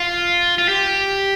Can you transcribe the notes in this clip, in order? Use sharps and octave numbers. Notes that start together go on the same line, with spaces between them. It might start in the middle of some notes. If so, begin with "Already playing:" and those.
Already playing: F4
F4
G4